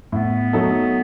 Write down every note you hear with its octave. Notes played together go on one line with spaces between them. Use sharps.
A2 B3
F#3 A3 D#4 A4